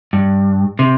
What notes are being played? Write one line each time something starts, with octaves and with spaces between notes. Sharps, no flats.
G2
C3